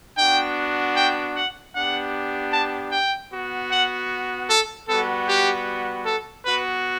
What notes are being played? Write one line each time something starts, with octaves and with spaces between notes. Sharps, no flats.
B3 D4 F#4 G5
G5
F#5
B3 D4 G4 F#5
A5
G5
B3 F#4
F#5
A4
G3 B3 F#4 A4
G4
A4
B3 F#4 B4